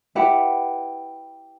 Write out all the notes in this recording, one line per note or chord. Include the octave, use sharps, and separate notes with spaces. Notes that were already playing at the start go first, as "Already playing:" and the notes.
E4 G4 B4 F#5